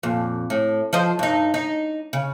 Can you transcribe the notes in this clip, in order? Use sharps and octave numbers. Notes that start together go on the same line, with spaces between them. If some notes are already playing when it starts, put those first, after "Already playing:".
F2 A#2
A2
F3 C5 D#5
G2 D#4
D#4
C#3